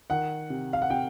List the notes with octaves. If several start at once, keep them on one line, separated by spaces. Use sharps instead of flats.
D#3 F#5
C3
F5
F#5
C3 G5